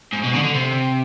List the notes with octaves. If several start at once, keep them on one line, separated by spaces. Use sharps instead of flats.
G#2
B2
D3
D3
C3